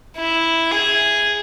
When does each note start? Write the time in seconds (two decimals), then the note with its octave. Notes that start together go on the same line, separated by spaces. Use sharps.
0.17 E4
0.71 G#4